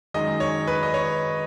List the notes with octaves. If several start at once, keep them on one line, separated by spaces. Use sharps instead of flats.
F#2 D#3 G#3 D#5
C#5
B4
D#5
C#5